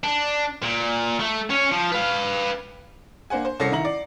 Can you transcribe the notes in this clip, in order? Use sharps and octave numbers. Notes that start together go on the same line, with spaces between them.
D4
A#2
A3
C#4 C#5
F3
B4 F5
A#3 D4 C5 F#5 G#5
C5
C2 C#4 A4 A#6 C7 C#7
D#3 E4 A#5 F#7
D5